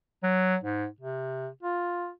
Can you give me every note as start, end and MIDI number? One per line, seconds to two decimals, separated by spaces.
0.23 0.56 54
0.64 0.87 44
1.00 1.48 48
1.63 2.10 65